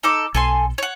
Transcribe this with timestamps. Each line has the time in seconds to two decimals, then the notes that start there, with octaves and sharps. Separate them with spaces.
0.03 D#4 A4 D6
0.35 B1 A4 G#5 C6
0.78 C#5 F#5